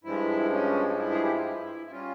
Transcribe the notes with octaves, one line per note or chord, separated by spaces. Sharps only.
G2 F3 G#3 E4
C#4
C#4
E4
G#4
G4
F4
E4
E4
G3 C#4 F4